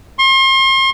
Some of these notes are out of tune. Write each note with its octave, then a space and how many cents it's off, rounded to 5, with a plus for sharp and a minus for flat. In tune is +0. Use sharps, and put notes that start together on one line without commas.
C6 +40